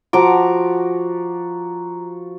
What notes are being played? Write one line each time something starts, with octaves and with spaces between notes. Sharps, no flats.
F3 F#4 A#5 D6